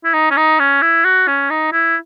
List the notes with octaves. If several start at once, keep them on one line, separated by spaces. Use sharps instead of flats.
E4
D#4
C#4
D#4
C#4
E4
F#4
C#4
D#4
E4